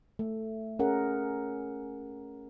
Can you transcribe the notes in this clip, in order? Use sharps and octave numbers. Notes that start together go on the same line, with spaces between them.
A3
C#4 G#4 A#4 F#5